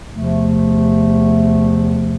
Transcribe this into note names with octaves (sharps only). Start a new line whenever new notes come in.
E2 C3 F3 A3